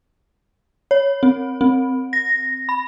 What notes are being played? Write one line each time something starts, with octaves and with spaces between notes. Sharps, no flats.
C#5
C4
C4
A#6
B5